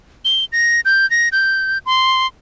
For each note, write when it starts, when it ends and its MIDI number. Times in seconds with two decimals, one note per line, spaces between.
0.25 0.45 103
0.52 0.80 94
0.85 1.08 91
1.10 1.29 94
1.32 1.78 91
1.86 2.27 84